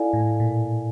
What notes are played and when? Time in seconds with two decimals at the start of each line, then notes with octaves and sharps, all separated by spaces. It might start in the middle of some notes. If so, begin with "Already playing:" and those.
Already playing: E4 A4 D5 F5 G#5
0.13 A2
0.40 A#2